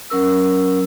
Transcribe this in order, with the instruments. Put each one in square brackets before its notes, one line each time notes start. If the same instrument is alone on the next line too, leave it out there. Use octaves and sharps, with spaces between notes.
[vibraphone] F#3 C#4 A#4 E6